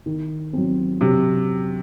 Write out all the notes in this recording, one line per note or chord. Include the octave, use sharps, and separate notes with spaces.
D#3
F#3 C4
C3 F#3